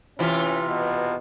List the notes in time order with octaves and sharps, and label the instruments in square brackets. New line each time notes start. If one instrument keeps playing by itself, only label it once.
[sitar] C3 E3 F4 [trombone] C#4
[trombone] B2